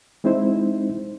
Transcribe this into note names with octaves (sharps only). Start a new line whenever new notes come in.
G#3 C4 D#4 E4 C5